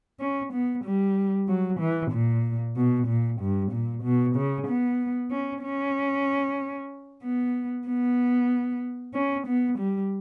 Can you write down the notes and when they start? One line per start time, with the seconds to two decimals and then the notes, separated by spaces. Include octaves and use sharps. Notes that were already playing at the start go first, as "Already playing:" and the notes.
0.20 C#4
0.53 B3
0.84 G3
1.48 F#3
1.80 E3
2.11 A#2
2.76 B2
3.07 A#2
3.40 G2
3.72 A#2
4.03 B2
4.36 C#3
4.67 B3
5.30 C#4
5.63 C#4
7.23 B3
7.87 B3
9.14 C#4
9.47 B3
9.78 G3